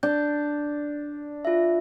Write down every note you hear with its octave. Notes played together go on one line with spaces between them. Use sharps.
D4 G6
F4 E5